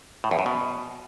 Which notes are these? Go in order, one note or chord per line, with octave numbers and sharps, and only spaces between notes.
A2
E2
F#2
B2